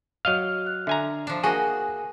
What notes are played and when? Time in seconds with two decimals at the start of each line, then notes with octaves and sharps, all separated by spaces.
0.25 F#3 D#5 F5 F6
0.67 F#6
0.87 D3 E5 G#5 A#5
1.27 F3 D4
1.44 A#3 F#4 G#4 D#5 G#5